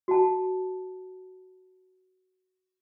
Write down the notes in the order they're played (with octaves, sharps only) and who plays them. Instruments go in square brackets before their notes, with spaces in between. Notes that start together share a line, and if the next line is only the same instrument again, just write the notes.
[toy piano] F#4 A5